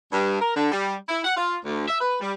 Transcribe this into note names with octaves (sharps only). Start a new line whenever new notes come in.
G2
A#4
D3
G3
E4
F#5
F4
D2
E5
B4
G3